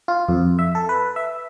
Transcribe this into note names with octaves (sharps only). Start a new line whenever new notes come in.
F4
F2
E5
A4
B4
E5